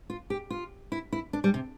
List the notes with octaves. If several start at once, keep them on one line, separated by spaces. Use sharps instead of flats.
F4
G4
F4
E4
E4
D4
G3
C3